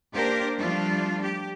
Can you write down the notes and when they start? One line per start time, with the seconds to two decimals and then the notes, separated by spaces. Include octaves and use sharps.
0.13 A#3 D4 G4 A#4 C5
0.59 F3 G3 A3 D4 F4
1.23 G4